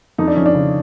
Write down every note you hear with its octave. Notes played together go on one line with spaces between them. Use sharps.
F2 D#4
D4
F3 C#4
D4
C#3